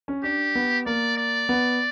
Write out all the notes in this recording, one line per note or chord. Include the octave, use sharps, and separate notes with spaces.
C#4
D4 G4
B3
A#3 D5
D5
B3